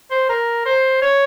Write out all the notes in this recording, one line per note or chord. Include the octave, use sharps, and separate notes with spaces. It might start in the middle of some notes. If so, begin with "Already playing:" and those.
C5
A#4
C5
C#5